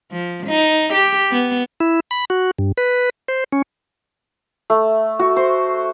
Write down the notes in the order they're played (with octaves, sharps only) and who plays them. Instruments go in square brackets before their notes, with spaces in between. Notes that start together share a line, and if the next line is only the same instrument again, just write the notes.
[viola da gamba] F3
D#4
G4
B3
[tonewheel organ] E4
B5
F#4
G2
B4
C5
C#4
[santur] A3
F#4
C5